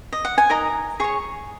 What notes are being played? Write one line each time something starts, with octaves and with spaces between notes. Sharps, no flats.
D#5
F#5
G#5
D#4 A#4 D#5 A#5
G#4 C#5 C#6